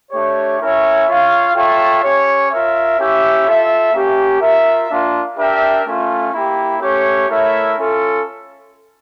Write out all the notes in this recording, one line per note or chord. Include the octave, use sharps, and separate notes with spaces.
A3 D4 G4 C#5
C#4 E4 A#4 C#5 E5
F4 C#5 F5
F4 A4 C#5 E5 G5
C#4 G4 C#5
F4 A#4 E5
C#4 E4 G4 C#5 E5
F4 A4 E5
A#3 C#4 G4
F4 A#4 E5
A#3 D4 F4
D4 G4 A#4 E5 G5
A3 C#4 F4
A#3 E4 G4
A3 C#4 G4 C#5
A3 E4 A#4 C#5 E5
C#4 F4 A4